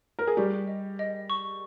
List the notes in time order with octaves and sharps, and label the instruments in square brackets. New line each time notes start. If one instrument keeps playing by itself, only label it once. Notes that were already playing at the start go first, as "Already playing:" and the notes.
[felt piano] A#4
G#4
[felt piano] G3 G4 [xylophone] C#6
[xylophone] D#5
D#5
C#6